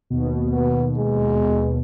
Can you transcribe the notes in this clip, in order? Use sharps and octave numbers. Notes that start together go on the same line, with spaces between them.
D#2 B2
B3
G#3